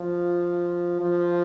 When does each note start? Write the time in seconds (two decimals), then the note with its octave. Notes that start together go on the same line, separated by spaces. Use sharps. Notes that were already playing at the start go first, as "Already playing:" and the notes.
Already playing: F3
1.00 F3